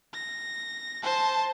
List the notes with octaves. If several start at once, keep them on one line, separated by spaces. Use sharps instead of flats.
A#6
C5 A5